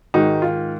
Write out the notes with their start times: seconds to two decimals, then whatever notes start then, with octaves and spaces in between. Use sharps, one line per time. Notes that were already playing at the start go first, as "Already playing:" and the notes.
0.14 G#2 D#3 D#4 F#4
0.42 F4